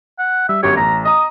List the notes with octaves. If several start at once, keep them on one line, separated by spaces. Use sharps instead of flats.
F#5
G3 E5
G1 F#2 G4 C#5
A1 A#5
D#5 A#5 D#6